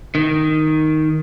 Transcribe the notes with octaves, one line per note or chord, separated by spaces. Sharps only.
D#3